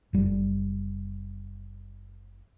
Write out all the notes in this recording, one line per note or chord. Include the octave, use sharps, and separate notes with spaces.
F#1 G3